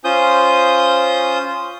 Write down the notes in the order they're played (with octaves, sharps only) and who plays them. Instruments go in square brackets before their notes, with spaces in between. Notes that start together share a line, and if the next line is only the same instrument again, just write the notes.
[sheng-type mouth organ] C#4 F4 C5 D#6 G6